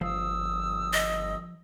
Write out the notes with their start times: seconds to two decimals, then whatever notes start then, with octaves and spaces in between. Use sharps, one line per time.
0.01 G1 F3 F5 D#6 E6
0.93 D#5